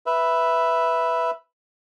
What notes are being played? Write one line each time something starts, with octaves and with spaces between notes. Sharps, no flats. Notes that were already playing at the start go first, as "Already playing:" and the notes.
B4 E5